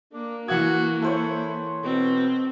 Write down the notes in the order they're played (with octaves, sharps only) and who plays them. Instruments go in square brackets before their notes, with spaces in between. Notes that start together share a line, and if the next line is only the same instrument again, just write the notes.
[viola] A#3 [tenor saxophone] D4
[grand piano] E3 F#5 G#6 [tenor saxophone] F#4
[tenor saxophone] E4 [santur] A4 C5 C#5
[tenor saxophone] B2 [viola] C4